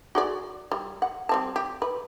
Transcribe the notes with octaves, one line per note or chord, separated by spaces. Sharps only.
F#4 G#4 D5
G3
F#5
G3 C4 A5
G4
B4